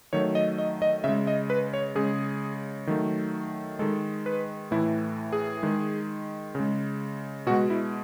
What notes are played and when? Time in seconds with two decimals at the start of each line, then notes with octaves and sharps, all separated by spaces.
0.13 D#3 F#3 A3 C#5
0.35 D#5
0.58 D#5
0.82 D#5
1.04 C#3 G#3 E5
1.27 D#5
1.50 B4
1.74 C#5
1.95 C#3 G#3 G#4
2.87 D#3 F#3 A3
3.79 D#3 G#3 A4
4.26 B4
4.71 A2 E3 A3 E4
5.33 G#4
5.63 D#3 G#3
6.55 C#3 G#3
7.47 B2 F#4
7.50 G#3
7.70 E4